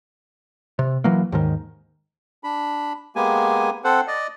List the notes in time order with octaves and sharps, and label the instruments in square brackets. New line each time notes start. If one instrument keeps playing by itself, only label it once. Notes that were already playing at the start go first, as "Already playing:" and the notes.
[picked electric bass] C3
E3 F#3 A#3
D#2 G#2 D#3
[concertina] D4 B5
G#3 A#3 B3 G4 G#5
C4 A4 C5 F#5
D5 D#5